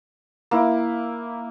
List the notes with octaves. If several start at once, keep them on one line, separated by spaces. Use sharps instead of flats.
A#3 E4